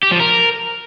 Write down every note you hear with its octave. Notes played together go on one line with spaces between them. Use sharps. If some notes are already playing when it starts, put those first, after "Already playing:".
G4
F3
A#4